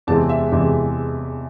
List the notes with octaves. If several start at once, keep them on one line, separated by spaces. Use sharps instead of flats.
E2 C3 E3 G#3 C4 A5
E5
E2 C3 E3 G#3 C4